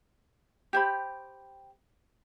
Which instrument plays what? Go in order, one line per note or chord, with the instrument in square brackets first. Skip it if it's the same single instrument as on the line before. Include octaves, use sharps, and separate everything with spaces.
[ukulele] G4 C5 B5